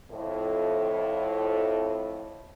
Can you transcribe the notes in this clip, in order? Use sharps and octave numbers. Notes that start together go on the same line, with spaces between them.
F2 A2